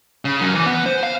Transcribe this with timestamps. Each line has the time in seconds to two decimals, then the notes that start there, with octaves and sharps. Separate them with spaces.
0.25 C#3
0.41 F#2
0.55 E3
0.66 B3
0.86 C5
1.03 F5